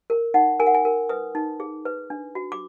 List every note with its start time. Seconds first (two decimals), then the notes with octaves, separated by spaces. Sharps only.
0.10 A#4
0.34 D#4 F#5
0.60 A#4 G#5
0.67 F#5
0.74 G#5
0.85 A#4
1.09 B4 D#6
1.35 D#4
1.60 G#4
1.85 B4
2.10 D4
2.35 F#4
2.52 D6